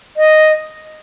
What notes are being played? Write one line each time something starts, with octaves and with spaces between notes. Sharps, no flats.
D#5